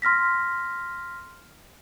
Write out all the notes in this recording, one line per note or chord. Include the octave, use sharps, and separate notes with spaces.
C6 F6 A#6 B6